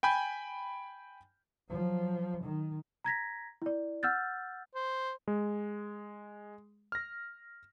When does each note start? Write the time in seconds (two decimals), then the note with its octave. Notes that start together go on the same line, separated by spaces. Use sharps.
0.03 G5 G#5 B5 G6
1.69 F3 F#3
2.43 D#3
3.04 A#5 G#6 A#6 B6
3.62 E4 D5
4.03 F#5 E6 F6 G6 A6
4.75 C5
5.28 G#3
6.92 F6 A#6